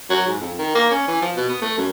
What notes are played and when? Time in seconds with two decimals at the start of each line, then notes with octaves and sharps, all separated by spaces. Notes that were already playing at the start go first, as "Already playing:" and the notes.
0.10 F#3
0.27 G#2
0.40 F2
0.59 D#3
0.75 A#3
0.91 C#4
1.08 E3
1.22 F3
1.36 B2
1.49 B3
1.62 A3
1.78 F#2